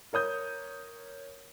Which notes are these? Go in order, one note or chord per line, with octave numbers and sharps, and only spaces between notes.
A#4 C#5 D#6 G6